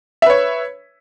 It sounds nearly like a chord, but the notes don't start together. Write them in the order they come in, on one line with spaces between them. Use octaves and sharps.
E5 B4 C#5